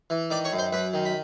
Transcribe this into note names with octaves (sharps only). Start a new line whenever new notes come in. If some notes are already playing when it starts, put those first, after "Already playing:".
E3
D#3 D5 D6
C#5 C#6
F#2
C5 C6
F#2 B4 B5
D#3
B5